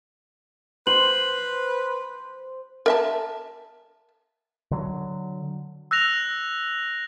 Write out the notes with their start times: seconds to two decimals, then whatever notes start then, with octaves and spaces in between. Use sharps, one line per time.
0.87 B4 C5 F#7
2.86 A#4 E5 A5
4.71 D3 F#3
5.91 E6 F#6 A#6 F7